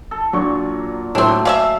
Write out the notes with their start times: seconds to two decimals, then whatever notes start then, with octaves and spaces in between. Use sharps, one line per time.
0.11 A4
0.33 A#2 F#3 D4 C#6
1.15 A2 F#3 A3 C4 D4 A4 C#5 G5
1.45 C#4 D5 E5 F5